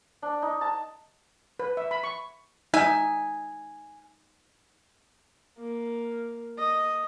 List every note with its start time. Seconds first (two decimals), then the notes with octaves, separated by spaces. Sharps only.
0.22 D4
0.42 D#4
0.61 A5
1.59 B4
1.77 E5
1.91 B5
2.04 C#6
2.74 D#4 E5 G#5
5.58 A#3
6.58 D#5